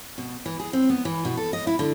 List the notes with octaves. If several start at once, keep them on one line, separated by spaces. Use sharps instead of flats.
B2
E3
G#4
C4
B3
E3
B2
A4
D#5
E4
D3